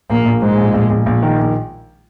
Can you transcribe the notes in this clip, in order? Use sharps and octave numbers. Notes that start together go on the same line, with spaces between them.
A#1 A#3
A#1
G#2 G#3
A#1
A#1
A#1
A#1
D#3
A#1